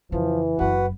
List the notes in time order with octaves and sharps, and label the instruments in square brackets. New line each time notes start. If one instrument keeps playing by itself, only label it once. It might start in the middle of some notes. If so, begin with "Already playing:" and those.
[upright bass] F2 C#3 [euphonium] E3 [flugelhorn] F3
[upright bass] F#1 F#2 [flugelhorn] F#4 [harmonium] B4 F#5